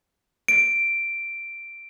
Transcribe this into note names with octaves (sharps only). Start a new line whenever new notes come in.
D7